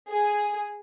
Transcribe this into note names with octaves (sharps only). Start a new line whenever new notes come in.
G#4